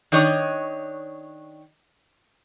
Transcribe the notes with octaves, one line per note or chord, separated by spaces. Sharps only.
D#3 D4 C#5 D#5